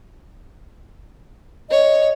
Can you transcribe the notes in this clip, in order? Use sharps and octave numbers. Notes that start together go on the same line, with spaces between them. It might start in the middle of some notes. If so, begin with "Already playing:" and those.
C#5 D#5